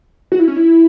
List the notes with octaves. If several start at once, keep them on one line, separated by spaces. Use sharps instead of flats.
F#4
E4
C#4
E4